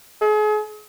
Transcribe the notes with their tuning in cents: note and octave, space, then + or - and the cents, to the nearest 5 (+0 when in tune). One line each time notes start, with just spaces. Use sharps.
G#4 +40